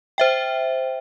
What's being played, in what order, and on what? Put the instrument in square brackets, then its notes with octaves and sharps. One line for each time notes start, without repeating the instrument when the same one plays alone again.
[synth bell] C5 E5 G5